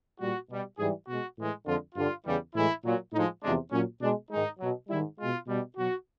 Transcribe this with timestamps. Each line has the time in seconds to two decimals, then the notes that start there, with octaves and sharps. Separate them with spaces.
0.19 A#2 G3 F#4
0.49 B2 G3
0.78 G#2 E3 G3 G#4
1.07 B2 G#3 F#4
1.37 A2 E3 G#3
1.65 F2 D3 F3 G#3 F4
1.95 G2 D3 G3 F4
2.25 E2 C#3 E3 G3
2.54 A2 E3 G#3 E4
2.83 A#2 F#3
3.13 A2 F3 G#3 D#4
3.42 E2 C3 F3 G#3 D4
3.71 A#2 F#3 C#4
4.01 B2 G#3 D4
4.30 G#2 D#3 G#3 D#4
4.59 B2 F#3
4.89 G#2 D#3 G3 E4
5.18 B2 G#3 F4
5.48 B2 G3
5.77 B2 F#3 F#4